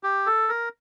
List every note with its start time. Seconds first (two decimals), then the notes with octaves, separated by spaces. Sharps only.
0.03 G4
0.26 A4
0.49 A#4